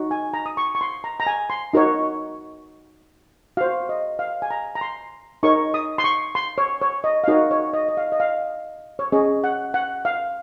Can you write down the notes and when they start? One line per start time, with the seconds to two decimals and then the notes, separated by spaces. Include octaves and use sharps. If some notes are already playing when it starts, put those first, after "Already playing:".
Already playing: D#4 F#4 C#5
0.11 G#5
0.34 A#5
0.46 D#6
0.57 C#6
0.75 C#6
0.81 C6
1.04 A#5
1.20 A#5
1.27 G#5
1.50 C6
1.73 D#4 F#4 A#4 C#5
3.57 F#4 C5 F5
3.89 D#5
4.19 F5
4.42 G#5
4.51 A#5
4.75 A#5
4.81 C6
5.43 D#4 A#4 C#5 C#6
5.74 D#6
5.98 C6
6.04 C#6
6.35 C6
6.58 C#5
6.81 C#5
7.04 D#5
7.24 F5
7.28 D#4 F#4 A#4 C#5 D#5
7.51 C#5
7.74 D#5
7.89 D#5
7.97 F5
8.12 D#5
8.20 F5
8.99 C#5
9.12 C#4 G#4 C#5 D#5
9.44 F#5
9.74 F#5
10.05 F5